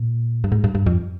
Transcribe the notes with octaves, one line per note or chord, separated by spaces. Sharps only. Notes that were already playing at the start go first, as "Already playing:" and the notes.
Already playing: A#2
G2
G#2
G2
G2
F2